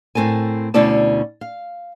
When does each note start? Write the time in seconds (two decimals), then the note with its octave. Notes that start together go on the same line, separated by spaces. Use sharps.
0.15 A2 C4 A4 A#4 G#5
0.74 D2 B2 C#4 E4 D5 A5
1.41 F5